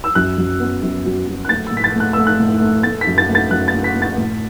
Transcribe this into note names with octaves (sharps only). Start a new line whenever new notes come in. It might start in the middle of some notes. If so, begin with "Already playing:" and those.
E6
F#2 F#6
F#2
B3
F#2
F#3
F#3
F#6
A3 A6
E6
A2
B6
A6
A3
F#6
A3 E6
F#6
A2
A3
A3 A6
B6
F#2
A6
A3
A6
F#2 F#6
A6
A3
B6
A3
A6
A2